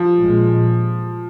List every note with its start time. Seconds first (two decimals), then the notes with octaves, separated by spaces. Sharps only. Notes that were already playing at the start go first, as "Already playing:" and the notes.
Already playing: F3
0.18 A#1 A#2 G#3